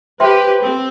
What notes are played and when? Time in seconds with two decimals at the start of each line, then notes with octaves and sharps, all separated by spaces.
0.20 G4 B4 C5 E5 G5 C6
0.60 C4